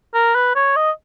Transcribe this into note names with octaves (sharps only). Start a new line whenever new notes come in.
A#4
B4
C#5
D#5